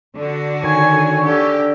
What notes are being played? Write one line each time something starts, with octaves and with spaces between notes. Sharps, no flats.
D3 D4 F#4
D#3 C#5 G#5
D3 G4